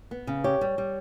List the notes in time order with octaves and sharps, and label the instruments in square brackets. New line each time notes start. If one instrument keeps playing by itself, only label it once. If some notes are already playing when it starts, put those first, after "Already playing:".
[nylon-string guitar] B3
C#3
[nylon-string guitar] G4 [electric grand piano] C#5
[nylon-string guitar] G3
G3